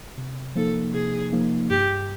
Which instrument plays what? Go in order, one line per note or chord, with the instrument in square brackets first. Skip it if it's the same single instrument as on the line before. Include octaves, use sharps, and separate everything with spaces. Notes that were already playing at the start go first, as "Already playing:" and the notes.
[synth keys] C3
[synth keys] F3 A#3 D#4 [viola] A4
[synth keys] C3 [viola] G#4
[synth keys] F3 A#3 D#4
[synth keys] G2 [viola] G4